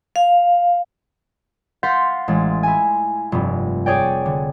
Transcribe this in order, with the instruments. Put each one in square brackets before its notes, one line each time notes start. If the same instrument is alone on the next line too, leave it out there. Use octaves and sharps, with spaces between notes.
[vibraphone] F5
[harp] F5 F#5 C6 G6 A6 B6
A1 G#3 A6
E4 G#5
F1 G2
G#4 C#5 D5 G5
D3